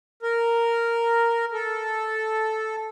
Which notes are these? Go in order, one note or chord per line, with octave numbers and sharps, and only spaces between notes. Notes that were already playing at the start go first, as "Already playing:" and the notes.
A#4
A4